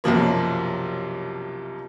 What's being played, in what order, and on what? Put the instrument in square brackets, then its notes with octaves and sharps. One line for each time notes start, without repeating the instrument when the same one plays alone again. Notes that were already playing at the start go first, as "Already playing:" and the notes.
[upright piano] B1 F#2 C3 F3 A#3